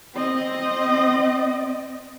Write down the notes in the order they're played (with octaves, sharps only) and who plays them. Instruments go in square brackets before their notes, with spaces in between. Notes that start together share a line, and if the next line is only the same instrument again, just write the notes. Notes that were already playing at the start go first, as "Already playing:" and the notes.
[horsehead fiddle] C4 D#5